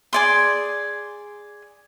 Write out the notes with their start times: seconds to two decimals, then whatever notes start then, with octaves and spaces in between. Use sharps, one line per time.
0.13 G#4 D5 C6